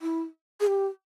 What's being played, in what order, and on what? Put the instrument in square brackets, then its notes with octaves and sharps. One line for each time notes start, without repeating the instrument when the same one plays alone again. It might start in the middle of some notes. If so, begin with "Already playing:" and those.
[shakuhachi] E4
G#4
G4